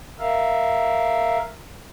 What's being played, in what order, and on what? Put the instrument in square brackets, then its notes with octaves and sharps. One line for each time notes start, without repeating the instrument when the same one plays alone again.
[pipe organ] A#4 E5 F5